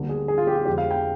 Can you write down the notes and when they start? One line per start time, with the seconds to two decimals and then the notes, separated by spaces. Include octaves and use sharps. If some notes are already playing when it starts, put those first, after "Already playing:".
Already playing: D2 D3 G3 A#3
0.09 G#4
0.28 G#4
0.38 F4
0.47 G4
0.56 F4
0.65 F2 D3 G#3 G4
0.78 F5
0.91 G5